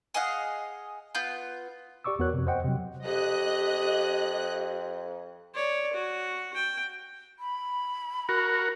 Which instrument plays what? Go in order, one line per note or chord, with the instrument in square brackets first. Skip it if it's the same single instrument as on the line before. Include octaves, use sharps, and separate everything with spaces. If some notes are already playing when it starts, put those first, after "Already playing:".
[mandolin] G#4 D#5 F5 F#5
B3 F4 G6
[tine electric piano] G4 D5 C#6 D6 E6
E2 B3 F#4 A#4 C#5 F#6
F2 C3
C5 D#5 F#5 G5
C3 F#3
[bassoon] F2 [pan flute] G4 [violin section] D#5 F#6
[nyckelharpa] C#5 D5
F#4
G5
[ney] B5
[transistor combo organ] F#4 A#4